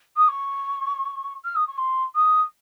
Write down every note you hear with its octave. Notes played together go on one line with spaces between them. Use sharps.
D#6
C#6
F6
D#6
C#6
C6
D#6